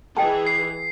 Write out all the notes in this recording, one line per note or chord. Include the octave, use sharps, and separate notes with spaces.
E3 G#4 D#5 G5 A5
C7